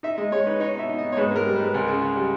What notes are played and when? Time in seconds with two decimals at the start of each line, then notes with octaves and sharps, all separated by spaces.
0.03 D#4 E5
0.18 G#3 D#5
0.32 G#3 C#5
0.46 D#4 B4
0.60 D#4 C#5
0.75 B2 E5
0.89 D#4
0.99 D#5
1.02 B2
1.12 C#5
1.17 G#2 B4
1.32 G#2 A#4
1.45 G3
1.55 B4
1.60 G#2
1.74 C#2 A#4
1.88 C#3
2.02 C#3
2.16 G3